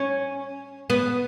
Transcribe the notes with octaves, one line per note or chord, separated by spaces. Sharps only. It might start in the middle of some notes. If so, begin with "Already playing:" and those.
Already playing: C#4
B3